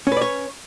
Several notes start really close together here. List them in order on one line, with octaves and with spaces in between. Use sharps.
C#4 B4 D5 C#5